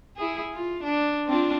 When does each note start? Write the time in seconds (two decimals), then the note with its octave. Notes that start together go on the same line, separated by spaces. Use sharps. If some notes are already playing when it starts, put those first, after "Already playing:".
0.17 E4 G#4
0.53 F4
0.83 D4
1.26 C4 D4 F4